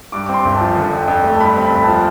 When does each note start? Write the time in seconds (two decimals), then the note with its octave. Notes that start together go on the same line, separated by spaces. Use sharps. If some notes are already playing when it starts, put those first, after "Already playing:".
0.12 G2 D6
0.26 C4 D6
0.34 C6
0.45 G1
0.55 A5
0.61 F3
0.76 D3
0.93 F2
1.08 F2
1.24 A3
1.34 A5
1.40 G2 B5
1.56 C4
1.61 B5
1.72 G1 B5
1.82 A5
1.88 F3